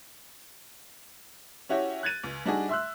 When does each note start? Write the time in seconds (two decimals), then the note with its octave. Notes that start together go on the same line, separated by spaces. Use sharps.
1.69 C#4 E4 F#4 G4 C#5
2.03 F#6 G#6 A6 D#7
2.24 C#2
2.46 G3 D4 D#4 F#4 G#4
2.69 E5 C6 E6 F#6